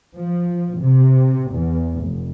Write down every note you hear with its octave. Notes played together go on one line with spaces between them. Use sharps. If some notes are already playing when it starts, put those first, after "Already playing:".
F3
C3
E2
F1